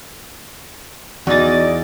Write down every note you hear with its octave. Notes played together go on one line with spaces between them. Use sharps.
E2 D#4 F#4 D5 D#5 A6